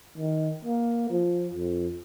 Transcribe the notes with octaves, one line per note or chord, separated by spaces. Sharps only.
D#3
A#3
F3
F2